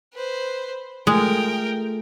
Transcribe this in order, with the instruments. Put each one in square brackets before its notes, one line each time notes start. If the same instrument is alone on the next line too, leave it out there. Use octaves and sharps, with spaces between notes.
[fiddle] B4 C5
[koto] G#3 [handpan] A3 F4 G#4 [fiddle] A#4 G5